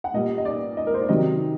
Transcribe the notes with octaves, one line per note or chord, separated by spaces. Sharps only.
F#5
A#2 G3 D#5
D#5
D5
D#5
A#4
C5
D5
C3 D#3 F#3 D#5